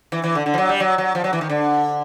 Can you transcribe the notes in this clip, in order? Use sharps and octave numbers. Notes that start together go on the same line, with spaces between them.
E3
E3
D3
D3
F3
F#3
G3
F#3
F#3
F3
F#3
E3
D#3
D3